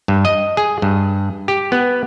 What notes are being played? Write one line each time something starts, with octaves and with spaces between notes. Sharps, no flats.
G2
D#5
G#4
G2
G4
B3